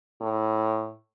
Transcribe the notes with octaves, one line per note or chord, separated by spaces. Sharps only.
A2